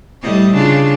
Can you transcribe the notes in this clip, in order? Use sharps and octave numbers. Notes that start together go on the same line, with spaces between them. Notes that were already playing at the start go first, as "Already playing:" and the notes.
A2 G3 D#5
C#3 D4 F4